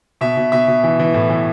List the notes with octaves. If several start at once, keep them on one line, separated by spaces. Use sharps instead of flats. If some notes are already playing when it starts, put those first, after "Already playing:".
B2 E5
B2
B2 E5
B2
E3
E3
A2
E3